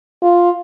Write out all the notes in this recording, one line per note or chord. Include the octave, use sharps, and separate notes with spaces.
F4